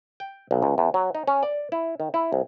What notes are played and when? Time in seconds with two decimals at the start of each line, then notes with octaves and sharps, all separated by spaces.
0.20 G5
0.51 B1
0.62 C#2
0.78 E2
0.94 F#3
1.15 D#4
1.28 C#4
1.43 D5
1.72 E4
2.00 D#3
2.14 E4
2.32 C2